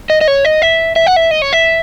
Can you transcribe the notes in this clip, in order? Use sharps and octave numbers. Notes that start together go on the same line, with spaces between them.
D#5
D#5
C#5
D#5
E5
E5
F#5
E5
D#5
C#5
E5